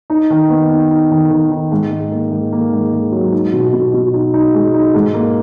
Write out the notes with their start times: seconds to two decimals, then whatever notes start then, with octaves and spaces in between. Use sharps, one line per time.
0.10 D#4
0.30 D#3
0.49 B3
0.70 D#4
0.90 D#4
1.11 D#3
1.31 D#3
1.51 D#4
1.72 G#2
1.91 G#2
2.11 A#3
2.31 G#2
2.52 A#3
2.73 G#2
2.93 G#2
3.12 F#3
3.32 D#4
3.53 B2
3.73 B2
3.94 B2
4.13 D#4
4.34 D#4
4.54 G#3
4.73 D#4
4.95 G#2
5.14 A#3